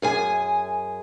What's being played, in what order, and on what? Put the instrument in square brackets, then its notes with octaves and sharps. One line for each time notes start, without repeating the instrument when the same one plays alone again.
[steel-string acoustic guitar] F#2 G#4 G#5